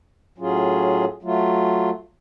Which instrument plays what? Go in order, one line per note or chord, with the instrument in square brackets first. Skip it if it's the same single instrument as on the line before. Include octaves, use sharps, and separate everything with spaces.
[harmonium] A2 F#3 C#4 F4 G#4
F#3 A3 F4